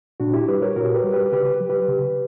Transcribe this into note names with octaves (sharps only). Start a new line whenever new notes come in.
A#2 D4 F#4
E4 G4
G3 G4 B4
A#4 C#5
A#2 F#4 A#4
G4 B4
G3
G4 B4
C#3 G4 B4
F#3
G4 B4
C#3